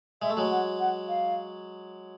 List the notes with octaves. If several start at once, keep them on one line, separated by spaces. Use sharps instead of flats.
G#3 E5
A3
F#3 G#3
F#5
F#5
F5